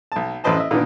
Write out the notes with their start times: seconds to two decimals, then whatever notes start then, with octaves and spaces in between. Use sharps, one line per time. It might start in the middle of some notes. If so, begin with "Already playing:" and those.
0.12 B1 A5
0.44 A1 F#2 B4 C5 D#5 A5
0.57 D#5 E5
0.71 A#2 D3 D#3 B3